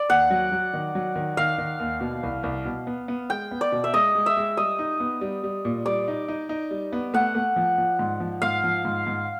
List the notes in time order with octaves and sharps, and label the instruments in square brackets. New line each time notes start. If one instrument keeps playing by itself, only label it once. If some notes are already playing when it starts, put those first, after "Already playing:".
Already playing: [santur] D5
[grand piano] D#2 [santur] F#5
[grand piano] F#3
F#3
D#3
F#3
D#3
[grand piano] D#3 [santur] F5
[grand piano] D#3
D#2
B2
C2
C2
B2
B3
B3
[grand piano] G#3 [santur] G5
[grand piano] B3
[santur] D5
[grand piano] B2
[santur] E5
[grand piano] G#3 [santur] D#5
[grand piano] G#3
[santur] E5
[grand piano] G#3
[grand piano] G3 [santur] D#5
[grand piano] D#4
B3
G3
G3
A#2
[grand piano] G3 [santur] D5
[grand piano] D#4
D#4
D#4
G3
B3
[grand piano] A3 [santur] F#5
[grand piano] A3
F3
F3
G#2
F3
[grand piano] G#2 [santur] F5
[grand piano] F3
G#2
G#2